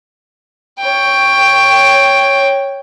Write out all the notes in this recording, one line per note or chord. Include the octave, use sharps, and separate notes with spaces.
C#5 G5